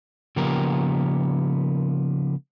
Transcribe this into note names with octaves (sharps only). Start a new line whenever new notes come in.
C#3 F3 A#3 B3 G4 A#4